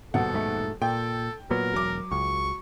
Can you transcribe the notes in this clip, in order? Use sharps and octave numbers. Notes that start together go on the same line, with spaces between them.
D#1 B2 A4 F#5
G#2 A3
A#2 A4 G5
A#2 F#3 B3 A#4
E1 F#3 D6
C#2 C#6